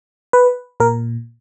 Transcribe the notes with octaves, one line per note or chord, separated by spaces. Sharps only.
B4
A#2 A#4